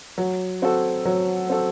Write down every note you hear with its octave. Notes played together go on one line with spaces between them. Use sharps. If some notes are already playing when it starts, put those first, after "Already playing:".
F#3
C4 F#4 A4
F#3
C4 F#4 A4